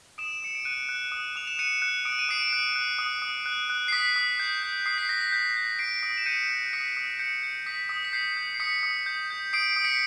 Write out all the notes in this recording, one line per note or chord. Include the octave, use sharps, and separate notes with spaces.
D#6 D7 E7
D#6 C#7
D7
F#6 C#7 D#7
F#6
D#6
D#6 F7
E7
F#6 C#7 D#7
F#6
D#6 D7
D#7
D#6 C7 D7
F#6
F#6
D#6
D#6
F#6
F#6
C7
D#6 B6
D#6
G6
G6
D#6 C7
B6
D#6 A#6
B6
G6
G6
D#6 C7 D7
D#6
E7
G6 C#7 D#7
G6
D#6 B6 C#7
D#6
G6 B6 C#7
G6
D#6 B6
D#6
B6
G6 C7
G6
C7
D#6 B6 C#7
D#6
G6
G6
D#6 C7 D7
D#6
B6 C#7